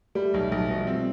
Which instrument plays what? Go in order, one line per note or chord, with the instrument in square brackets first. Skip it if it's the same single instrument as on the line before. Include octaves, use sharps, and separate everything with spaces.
[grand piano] G3 [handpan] A3
[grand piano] B1 [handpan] A3
[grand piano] B1 [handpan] G3
[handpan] F3
[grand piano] B2
[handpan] F3
[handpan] G3 [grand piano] C4
[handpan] A3